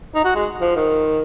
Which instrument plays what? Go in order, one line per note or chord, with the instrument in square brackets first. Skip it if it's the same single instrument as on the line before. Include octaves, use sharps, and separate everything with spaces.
[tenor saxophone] D#4
F#4
G#3
F3
D#3